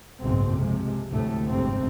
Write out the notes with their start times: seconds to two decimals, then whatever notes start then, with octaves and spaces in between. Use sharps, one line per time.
0.21 F#1 B1 G#2 B2 C4
0.57 C3 F3 G#3
1.10 D2 A2 C3 A3
1.47 G1 F2 G#2 C3 C4